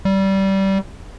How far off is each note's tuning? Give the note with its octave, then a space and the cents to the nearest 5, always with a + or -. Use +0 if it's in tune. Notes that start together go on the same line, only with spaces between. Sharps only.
G3 -20